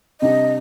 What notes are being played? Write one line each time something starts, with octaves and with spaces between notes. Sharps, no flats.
C3 G3 D4 G4 D#5